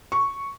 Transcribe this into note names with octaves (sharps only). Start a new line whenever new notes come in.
C#6